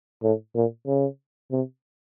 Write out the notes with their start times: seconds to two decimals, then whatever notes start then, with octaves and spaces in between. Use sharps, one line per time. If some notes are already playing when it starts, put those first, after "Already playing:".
0.23 A2
0.55 A#2
0.86 C#3
1.52 C3